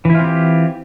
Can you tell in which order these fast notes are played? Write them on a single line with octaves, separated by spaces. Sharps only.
E3 E4 F4 C4 G4